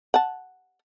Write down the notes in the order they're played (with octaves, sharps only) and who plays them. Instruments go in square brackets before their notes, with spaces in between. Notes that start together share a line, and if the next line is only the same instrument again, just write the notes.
[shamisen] F#5 A5